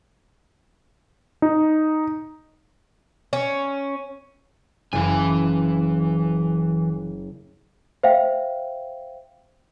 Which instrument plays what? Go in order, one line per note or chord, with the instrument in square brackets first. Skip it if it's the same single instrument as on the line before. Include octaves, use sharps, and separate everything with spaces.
[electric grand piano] D#4
[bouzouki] C#4
[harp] F#1 [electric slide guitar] E3 G#5
[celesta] C5 E5 F5 G5